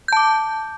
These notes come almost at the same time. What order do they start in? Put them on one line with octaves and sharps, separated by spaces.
G6 A5 D6